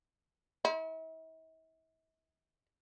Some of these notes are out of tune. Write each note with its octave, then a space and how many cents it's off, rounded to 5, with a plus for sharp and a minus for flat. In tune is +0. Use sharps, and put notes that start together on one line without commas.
E4 -45